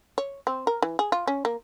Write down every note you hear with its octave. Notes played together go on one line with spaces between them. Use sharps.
C#5
C4
A#4
E3
G#4
F4
C#4
A#3